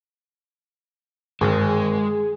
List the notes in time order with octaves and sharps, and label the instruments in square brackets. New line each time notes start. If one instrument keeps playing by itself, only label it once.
[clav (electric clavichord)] G#1 [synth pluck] G2 D3 D#3 [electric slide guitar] G#3 [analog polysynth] G#4